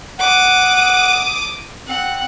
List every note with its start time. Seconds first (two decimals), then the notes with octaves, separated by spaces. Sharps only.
0.19 F#5 D6 D#6
1.87 C4 F#5